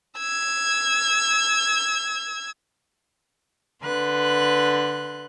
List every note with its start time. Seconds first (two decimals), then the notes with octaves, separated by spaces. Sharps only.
0.19 E6 G#6
3.84 D3 B4 C6 F#6